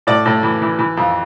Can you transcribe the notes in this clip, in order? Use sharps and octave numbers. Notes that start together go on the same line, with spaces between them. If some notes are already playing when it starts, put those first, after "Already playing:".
A2 D5
A2
E3
E3
E3
F2